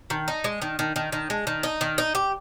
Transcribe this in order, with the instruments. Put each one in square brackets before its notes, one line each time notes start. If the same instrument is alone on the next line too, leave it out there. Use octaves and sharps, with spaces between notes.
[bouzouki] D#3
D#4
G#3
D#3
D#3
D#3
D#3
G#3
D#3
D#4
D#3
D#4
G4